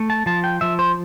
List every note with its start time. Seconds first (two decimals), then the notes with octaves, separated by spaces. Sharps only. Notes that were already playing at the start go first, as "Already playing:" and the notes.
Already playing: A3
0.10 A5
0.26 F3 A5
0.44 G5
0.61 F3 E5
0.79 C5